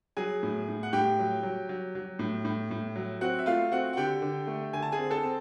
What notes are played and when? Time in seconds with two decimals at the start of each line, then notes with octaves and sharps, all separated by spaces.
0.17 F#3 G#4 G#5
0.43 A2
0.68 A2
0.83 F#5
0.93 A2 G4 G5
1.19 F#3
1.43 F#3
1.69 F#3
1.95 F#3
2.19 A2
2.45 A2
2.71 A2
2.96 F#3
3.21 C4 F#4 F#5
3.39 E5
3.46 A3 F4 F5
3.72 C4 F#4 F#5
3.93 F#5
3.97 D3 G4 G5
4.22 D3
4.47 A3
4.73 D3 G#5
4.82 A5
4.92 G#4 G#5
4.98 C4
5.11 A4 A5
5.24 C4